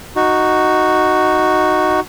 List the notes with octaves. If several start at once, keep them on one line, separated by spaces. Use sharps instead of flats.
D#4 F#4